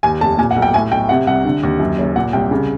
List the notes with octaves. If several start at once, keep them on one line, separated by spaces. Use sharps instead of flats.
D#2 G#5
F1 A5
A#2 G#5
F#5
B1
G5
A2 G#5
B1 G5
C3 F#5
C2 F#5
D3
D#2
F#2
F#1
A#2 F#5
C2 G5
C#3